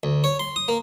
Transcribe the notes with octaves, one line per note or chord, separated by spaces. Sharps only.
D2
C#5
C6
D#6
A#3